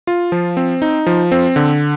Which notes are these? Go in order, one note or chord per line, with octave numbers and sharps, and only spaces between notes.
F4
F3
C4
D#4
F3
C4
D3